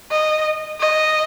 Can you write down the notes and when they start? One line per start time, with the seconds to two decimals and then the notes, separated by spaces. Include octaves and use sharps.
0.11 D#5
0.80 D#5